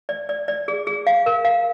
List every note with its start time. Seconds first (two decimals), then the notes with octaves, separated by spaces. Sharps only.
0.09 D5
0.29 D5
0.48 D5
0.68 G#4
0.87 G#4
1.07 F5
1.26 A#4
1.45 F5